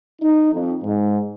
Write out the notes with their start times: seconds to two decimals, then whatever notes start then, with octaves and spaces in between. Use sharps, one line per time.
0.20 D#4
0.53 F2
0.82 G#2